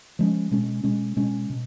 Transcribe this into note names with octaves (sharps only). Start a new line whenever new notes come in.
F3 G#3 C#4
B2 G#3 C#4
B2 G#3 C#4
B2 G#3 C#4
B2